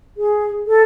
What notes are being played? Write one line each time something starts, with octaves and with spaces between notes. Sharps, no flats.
G#4
A4